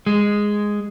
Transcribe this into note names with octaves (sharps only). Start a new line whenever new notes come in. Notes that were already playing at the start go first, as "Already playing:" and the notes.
G#3